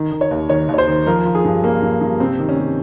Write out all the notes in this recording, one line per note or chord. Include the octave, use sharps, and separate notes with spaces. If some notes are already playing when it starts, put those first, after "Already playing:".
Already playing: D#3
D#3
C#5
D#2
D#3 C#5
D#2
C#5
C5
D#3
F3 A#4
F3
G#4
G2
F3 A#3
G2
G2
C3 C4
D#3
C#4
C3